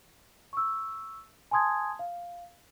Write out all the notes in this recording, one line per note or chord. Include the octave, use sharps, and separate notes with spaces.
C#6 E6
G#5 A5 C6 D#6 G#6
F5